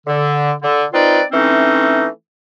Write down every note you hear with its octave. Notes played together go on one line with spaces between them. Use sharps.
D3
D3
C4 D#4 F4 B4 D5
E3 A3 C4 C#4 D#4